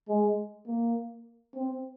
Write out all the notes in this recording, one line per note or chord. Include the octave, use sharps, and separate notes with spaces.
G#3
A#3
C4